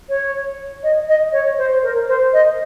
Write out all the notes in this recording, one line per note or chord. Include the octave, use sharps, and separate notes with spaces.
C#5
D#5
D#5
C#5
C5
A#4
C5
D#5